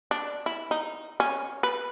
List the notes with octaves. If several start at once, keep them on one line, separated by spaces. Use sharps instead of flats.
D4
E4
D#4
C#4
B4